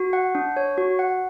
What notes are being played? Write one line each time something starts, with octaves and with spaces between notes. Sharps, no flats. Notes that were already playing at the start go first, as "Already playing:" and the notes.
Already playing: F#4
F#5
D4
C#5
F#4
F#5